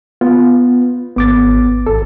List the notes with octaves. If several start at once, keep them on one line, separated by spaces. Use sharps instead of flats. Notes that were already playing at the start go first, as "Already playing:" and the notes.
B3 F4
G#1 B3 D6 A6
G#1 A4